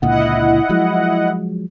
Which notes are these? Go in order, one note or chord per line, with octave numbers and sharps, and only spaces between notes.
C#2 A#2 D3 E4 D#5 F#5
F3 F#3 G#3